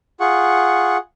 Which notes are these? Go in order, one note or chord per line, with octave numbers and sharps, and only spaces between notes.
F4 G#4 F#5 C#6